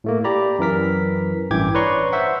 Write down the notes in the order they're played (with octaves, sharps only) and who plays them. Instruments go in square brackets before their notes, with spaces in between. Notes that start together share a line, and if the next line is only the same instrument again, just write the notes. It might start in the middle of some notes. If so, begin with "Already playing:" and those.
[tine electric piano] A2 A3 A#3
G4 D5 A#5 B5
F#2 E3 A#4 B6
A1 G2 E3 G5 D6 G#6
B4 C#5 D5 A#5 C6 C#6
C5 E5 F#5